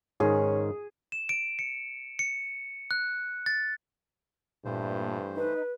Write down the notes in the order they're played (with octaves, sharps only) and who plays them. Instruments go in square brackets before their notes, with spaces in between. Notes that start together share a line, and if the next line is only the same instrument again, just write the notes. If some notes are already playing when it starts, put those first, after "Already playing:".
[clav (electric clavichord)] G#2 D#3 [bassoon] C#4 [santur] G#4
[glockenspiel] E7
D7
C#7
C#7
F#6
A6
[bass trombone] G2 [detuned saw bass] A#2 [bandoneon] E3 A3 C5
[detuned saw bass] D#4 [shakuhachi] B4